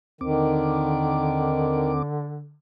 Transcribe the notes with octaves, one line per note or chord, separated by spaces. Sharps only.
D#2 D3 D#3 C4 D6